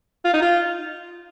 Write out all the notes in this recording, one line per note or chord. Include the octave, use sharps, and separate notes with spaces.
F4
D#4
F4